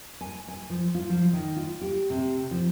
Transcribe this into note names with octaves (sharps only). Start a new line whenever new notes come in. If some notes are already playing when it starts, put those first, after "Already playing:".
G#5
G#5
F3
F4
F3
D#3
F4
G4
C3
F3